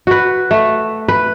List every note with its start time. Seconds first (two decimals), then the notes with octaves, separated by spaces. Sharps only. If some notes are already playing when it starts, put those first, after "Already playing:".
0.07 F#4 B4
0.51 A3
1.08 B4